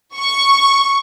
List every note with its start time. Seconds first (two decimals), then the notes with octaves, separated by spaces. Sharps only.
0.17 C#6